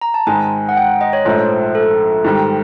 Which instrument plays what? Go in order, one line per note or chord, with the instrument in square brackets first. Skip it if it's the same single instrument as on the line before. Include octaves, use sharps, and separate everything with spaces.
[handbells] A#5
A5
[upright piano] G#2 D#3 G#3 [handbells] G#5
[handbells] F#5
G5
D#5
C#5
[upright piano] A#1 G#2 F3 A3 [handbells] C5
[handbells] A4
[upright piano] G#2 D#3 G3